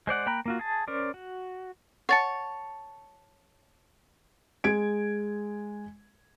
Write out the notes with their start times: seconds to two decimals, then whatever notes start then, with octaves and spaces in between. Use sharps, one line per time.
0.07 G#3 C5 D5 F#5
0.26 A#3 G5 A#5 B5 F#6
0.46 A#3 F4 F#4
0.59 G#4 A5
0.88 C#4 A#4 C5 D5
1.14 F#4
2.09 C#5 F#5 A5 A6 C#7
4.64 G#3 G#6 D7